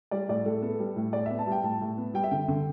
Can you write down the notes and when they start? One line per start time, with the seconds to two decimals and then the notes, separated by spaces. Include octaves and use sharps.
0.11 G3 D5
0.29 A2 D5
0.45 A2 A4
0.62 B3 A4
0.79 G3
0.96 A2
1.13 A2 D5
1.26 B3 E5
1.39 A5
1.47 G3
1.52 G5
1.63 A2 A5
1.81 A2
1.98 B3
2.14 G3 G5
2.24 E5
2.31 D3 G5
2.48 D3